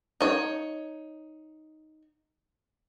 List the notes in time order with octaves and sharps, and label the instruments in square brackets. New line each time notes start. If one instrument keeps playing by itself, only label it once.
[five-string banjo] D#4 C#5